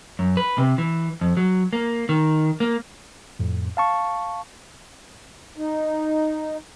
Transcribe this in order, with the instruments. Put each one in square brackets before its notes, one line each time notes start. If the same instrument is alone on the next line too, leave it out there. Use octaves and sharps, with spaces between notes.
[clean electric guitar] F#2
B4
C3
E3
F2
F#3
A#3
D#3
A#3
[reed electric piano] F2 A2
F5 A5 C#6
[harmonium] D#4